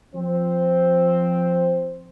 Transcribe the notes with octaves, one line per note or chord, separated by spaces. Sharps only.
F3 C4 C5